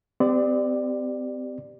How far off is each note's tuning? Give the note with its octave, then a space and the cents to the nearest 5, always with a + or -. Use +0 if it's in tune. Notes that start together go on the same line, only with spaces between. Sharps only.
C4 -40 G4 +0 D5 +15